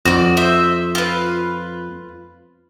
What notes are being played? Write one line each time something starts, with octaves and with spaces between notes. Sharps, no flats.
F2 F#4 D5
C5 E5
F4 B4